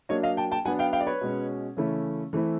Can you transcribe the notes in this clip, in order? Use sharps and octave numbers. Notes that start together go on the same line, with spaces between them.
F#3 A#3 D4 C#5 D#5
D#5 F5
G5 A5
G5 A5
F#3 B3 D4 F#5 G#5
F5 G5
F5 G5
D5
B4 C#5
B2 G#3 C#4
C#3 E3 A3 C#4 E4
E3 A3 C4 E4